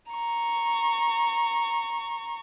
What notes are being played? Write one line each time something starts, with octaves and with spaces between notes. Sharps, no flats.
A#5 C#6